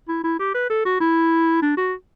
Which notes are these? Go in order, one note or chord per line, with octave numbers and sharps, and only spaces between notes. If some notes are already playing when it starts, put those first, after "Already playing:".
E4
E4
G4
B4
A4
F#4
E4
D4
F#4